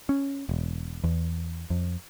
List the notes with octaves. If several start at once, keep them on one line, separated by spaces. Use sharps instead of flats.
C#4
E1
E2
F2